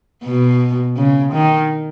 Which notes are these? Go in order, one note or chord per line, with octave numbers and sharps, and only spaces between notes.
B2
C#3
D#3